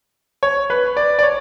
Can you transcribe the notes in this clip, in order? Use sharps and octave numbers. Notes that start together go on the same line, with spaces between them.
C#5
B4
D5
D5
C#5